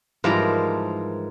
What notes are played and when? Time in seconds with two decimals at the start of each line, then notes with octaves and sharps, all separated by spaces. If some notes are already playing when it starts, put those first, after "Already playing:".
0.24 G#2 E3 F3 G3 A#4 A#5